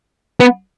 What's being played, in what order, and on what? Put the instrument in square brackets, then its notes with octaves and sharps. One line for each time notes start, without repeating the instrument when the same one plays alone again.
[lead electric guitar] B3